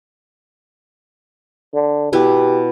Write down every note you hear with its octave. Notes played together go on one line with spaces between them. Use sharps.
D3
B2 B3 E4 G4